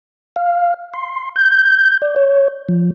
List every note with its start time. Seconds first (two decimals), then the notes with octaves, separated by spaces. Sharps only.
0.36 F5
0.94 C6
1.36 G6
2.02 D5
2.16 C#5
2.69 F3